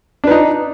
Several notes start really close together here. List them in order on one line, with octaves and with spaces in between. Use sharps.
D4 B4 D#4